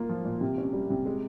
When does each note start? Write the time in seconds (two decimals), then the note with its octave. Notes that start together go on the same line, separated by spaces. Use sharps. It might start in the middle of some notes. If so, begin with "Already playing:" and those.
Already playing: A#3 F4
0.09 F3
0.25 A#2
0.41 C3
0.58 C#4
0.73 G3
0.90 C3
1.06 G#3